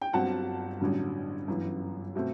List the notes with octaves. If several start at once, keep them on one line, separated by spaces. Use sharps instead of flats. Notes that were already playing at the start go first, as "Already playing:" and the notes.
G5
G1 G2 F#3 C4 F#5 A5
A1 G2 D3 F#3
G1 F#2 E3
B2 A3 C4